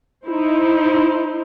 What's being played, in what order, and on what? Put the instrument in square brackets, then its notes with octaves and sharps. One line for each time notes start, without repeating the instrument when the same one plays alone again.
[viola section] D#4 E4 C5